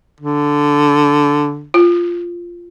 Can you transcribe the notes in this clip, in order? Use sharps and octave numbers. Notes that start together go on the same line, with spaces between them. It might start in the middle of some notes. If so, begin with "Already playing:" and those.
D3
F4